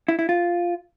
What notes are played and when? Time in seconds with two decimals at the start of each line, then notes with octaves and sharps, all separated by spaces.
0.08 E4
0.19 E4
0.29 F4